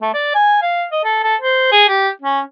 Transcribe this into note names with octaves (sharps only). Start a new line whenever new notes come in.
A3
D5
G#5
F5
D#5
A4
A4
C5
G#4
G4
C#4